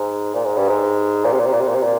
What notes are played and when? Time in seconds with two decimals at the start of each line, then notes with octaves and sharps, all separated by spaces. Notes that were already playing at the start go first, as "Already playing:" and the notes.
Already playing: G#2
0.34 A#2
0.45 G#2
0.57 G2
0.69 G#2
1.24 A#2
1.32 C3
1.39 A#2
1.46 C3
1.53 A#2
1.61 C3
1.68 A#2
1.75 C3
1.83 A#2